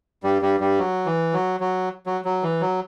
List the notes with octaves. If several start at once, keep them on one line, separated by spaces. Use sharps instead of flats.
G2 G3
G2 G3
G2 G3
F#3
E3
F#3
F#3
F#3
F#3
E3
F#3